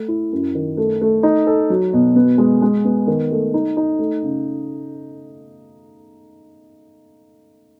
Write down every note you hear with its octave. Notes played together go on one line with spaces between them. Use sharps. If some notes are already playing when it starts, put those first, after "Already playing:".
Already playing: A3
E4
F#2
D#3
A3
A3
D#4
A4
F#3
B2
B3
G#3
G#3
B3
D#3
A3
D#4
D#4
A3
C#3